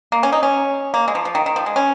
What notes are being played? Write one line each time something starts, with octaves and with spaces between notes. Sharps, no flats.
A#3
C#4
D#4
C#4
A#3
G#3
F3
F3
D#3
D#3
F3
G#3
C#4